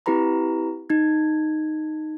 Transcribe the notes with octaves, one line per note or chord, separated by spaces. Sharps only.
C4 E4 G4 B4 A#5 B5
D#4 G#6